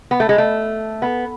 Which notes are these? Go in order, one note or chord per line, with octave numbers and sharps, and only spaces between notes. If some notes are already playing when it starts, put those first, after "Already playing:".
B3
A3
G#3
A3
B3